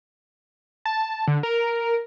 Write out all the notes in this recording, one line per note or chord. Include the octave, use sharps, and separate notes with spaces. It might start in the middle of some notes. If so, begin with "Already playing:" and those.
A5
D3
A#4